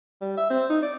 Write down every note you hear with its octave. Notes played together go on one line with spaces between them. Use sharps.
G3
E5
C4
D#4
D5